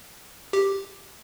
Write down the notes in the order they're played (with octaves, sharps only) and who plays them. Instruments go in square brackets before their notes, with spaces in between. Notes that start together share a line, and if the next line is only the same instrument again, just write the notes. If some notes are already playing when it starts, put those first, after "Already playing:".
[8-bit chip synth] G4